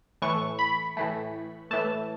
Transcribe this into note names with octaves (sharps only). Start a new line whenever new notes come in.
A2 E3 A3 C#6
B5
A2 E3 A3
A2 E3 A3 A5